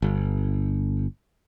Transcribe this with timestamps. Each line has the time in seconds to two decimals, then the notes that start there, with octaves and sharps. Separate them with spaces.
0.02 G1